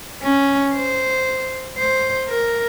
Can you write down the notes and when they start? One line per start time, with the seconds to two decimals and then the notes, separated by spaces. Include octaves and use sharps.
0.23 C#4
0.75 C5
1.78 C5
2.29 A#4